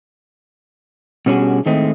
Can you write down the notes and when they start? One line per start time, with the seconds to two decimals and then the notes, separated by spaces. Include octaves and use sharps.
1.26 B2 G3 C#4 D4 F#4 G#4
1.66 A2 D#3 G#3 A3 C4 D#5